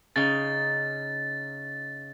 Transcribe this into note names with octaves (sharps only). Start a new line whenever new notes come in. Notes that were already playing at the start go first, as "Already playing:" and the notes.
C#3 D#4 A6